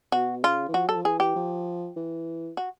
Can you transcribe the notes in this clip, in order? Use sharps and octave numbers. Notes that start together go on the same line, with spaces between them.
B2 F#4
C#3 F4
E3
F3 F#4
F#3 A4
F3
E3 G#4
G4
F3
E3
F#4